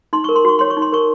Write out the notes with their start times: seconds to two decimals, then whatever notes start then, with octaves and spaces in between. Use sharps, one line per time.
0.13 D#4 C6
0.24 A#4 C#6
0.36 C6
0.45 F#4 C#6
0.59 C#5 C6
0.70 C#6
0.77 D#4
0.82 C6
0.92 A#4 C#6